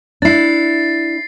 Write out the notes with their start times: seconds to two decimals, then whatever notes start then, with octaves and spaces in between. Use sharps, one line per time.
0.22 D4 E4 A6 C7